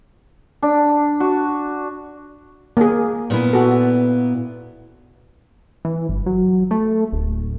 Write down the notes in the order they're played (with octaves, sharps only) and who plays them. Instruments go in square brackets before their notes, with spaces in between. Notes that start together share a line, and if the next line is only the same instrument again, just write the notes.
[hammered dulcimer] D4
F#4
[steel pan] A#3 G#4
[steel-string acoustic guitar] A#2 B3 E4
[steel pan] F#4 A4
[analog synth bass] E3
G1
F#3
A3
D1